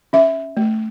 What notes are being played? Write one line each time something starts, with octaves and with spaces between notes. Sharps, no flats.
C#4 E5
A3